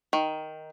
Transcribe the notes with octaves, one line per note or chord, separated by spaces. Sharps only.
D#3